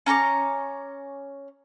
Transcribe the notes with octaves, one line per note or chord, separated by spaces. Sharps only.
C#4 A#5 C#6 D6